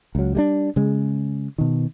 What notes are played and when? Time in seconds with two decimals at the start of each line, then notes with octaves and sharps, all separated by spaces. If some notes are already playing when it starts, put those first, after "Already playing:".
0.15 C#2 F#3
0.35 G3 G#3 D4
0.76 C#3 G#3
1.58 B2 D#3